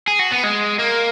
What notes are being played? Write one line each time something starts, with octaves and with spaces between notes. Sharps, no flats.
G#4
F#4
B3
G#3
A#3